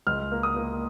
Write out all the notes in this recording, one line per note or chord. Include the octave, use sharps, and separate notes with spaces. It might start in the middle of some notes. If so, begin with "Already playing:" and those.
C#2 F6
A#3
D#6
A#3